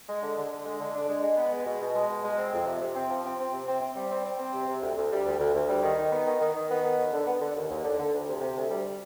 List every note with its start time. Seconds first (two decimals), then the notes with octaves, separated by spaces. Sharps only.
0.08 G#3
0.22 D3
0.37 D3
0.51 D3
0.65 G#3
0.80 D3
0.94 D4
1.09 G#3
1.23 G#3
1.37 B3
1.51 G#3
1.65 B2
1.81 B2
1.95 G#3
2.09 B2
2.23 G#3
2.38 C4
2.53 F2
2.67 C3
2.81 C3
2.95 C4
3.09 F3
3.25 C4
3.38 C4
3.53 C3
3.67 C4
3.81 C4
3.95 G3
4.10 C4
4.25 C4
4.39 C4
4.53 C3
4.68 C3
4.82 D2
4.97 D2
5.11 G3
5.26 D2
5.39 D2
5.54 D2
5.68 G3
5.83 D#3
5.98 D#4
6.11 B3
6.26 D#3
6.40 D#3
6.55 D#3
6.70 B3
6.83 D#3
6.98 D#2
7.13 D3
7.27 B3
7.41 D3
7.55 D#2
7.70 D#2
7.84 D3
7.98 D3
8.13 D2
8.28 C3
8.41 C3
8.55 D2
8.70 G3